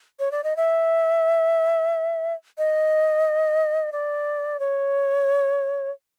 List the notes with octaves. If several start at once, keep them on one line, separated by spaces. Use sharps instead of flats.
C#5
D5
D#5
E5
D#5
D5
C#5